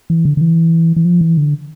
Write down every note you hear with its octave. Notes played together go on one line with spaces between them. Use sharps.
E3
D3
D3
E3
E3
F3
E3
D3